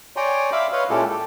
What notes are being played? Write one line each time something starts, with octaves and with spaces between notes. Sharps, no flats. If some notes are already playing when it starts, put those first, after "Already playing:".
C#5 D5 G5 G#5 A#5 C6
E5 F5 B5 C6 D6
B4 C#5 D#5 F5 C6
A#2 G#3 C#4 E4 G4 A4
G4 A4